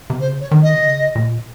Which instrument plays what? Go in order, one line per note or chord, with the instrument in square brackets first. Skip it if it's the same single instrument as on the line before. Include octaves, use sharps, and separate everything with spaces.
[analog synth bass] C3
[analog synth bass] C#3 [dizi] C5
[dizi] C#5
[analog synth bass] D#3
[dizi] D#5
[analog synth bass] C3
C#3
A#2